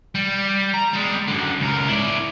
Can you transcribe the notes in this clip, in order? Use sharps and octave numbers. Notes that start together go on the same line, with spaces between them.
G3
A#5
G3 G#3
F#2 D3
C#2 A#4
E4 D5